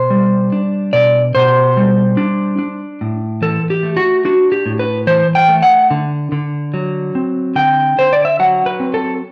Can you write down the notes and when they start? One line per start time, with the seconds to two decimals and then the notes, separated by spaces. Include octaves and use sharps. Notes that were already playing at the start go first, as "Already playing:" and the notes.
Already playing: B2 C5
0.10 G3
0.52 D4
0.93 B2 D5
1.35 B2 C5
1.77 G3
2.17 D4
2.59 D4
3.01 A2
3.42 E3 A4
3.70 G4
3.83 A3
3.97 F#4
4.25 D4 F#4
4.52 G4
4.66 A2
4.79 B4
5.07 E3 C5
5.35 G5
5.48 A3
5.62 F#5
5.91 D3
6.32 D3
6.74 F#3
7.15 C4
7.56 D3 G5
7.98 D3 C5
8.13 D5
8.25 E5
8.39 F#3 F#5
8.66 B4
8.80 C4
8.94 A4